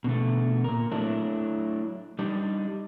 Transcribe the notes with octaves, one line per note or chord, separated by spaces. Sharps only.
B2 D3 A3
A#2 A#4
F#3 A3 D4 E4
G3 D4 D#4